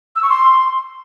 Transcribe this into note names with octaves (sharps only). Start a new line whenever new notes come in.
E6
C#6
C6